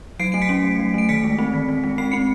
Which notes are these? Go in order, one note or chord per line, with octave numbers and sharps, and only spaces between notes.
F#3 C7 D7
A3 D7
B6 C#7
C#4
F#3
F#3
A3 D7
D#3 B6 C#7
G#3
C4
D#3
D#3
G#3
C4 C7
C4 C#7